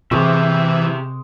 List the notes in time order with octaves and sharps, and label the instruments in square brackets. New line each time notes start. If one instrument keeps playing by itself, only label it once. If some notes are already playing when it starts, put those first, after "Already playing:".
[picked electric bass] C3 [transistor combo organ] E3 [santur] G#3 C#6 D6 [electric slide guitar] G4 E5